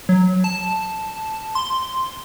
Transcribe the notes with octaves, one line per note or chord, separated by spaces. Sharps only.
F#3
A5
C6